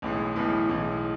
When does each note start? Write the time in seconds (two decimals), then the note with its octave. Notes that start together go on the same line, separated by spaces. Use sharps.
0.02 B1 A2 E3 G#3
0.36 B1 A2 E3 G#3
0.69 B1 A2 E3 G#3